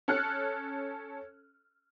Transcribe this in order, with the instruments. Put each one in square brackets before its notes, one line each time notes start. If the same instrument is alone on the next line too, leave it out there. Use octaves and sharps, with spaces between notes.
[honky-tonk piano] C#4 A4 F6 F#6 C#7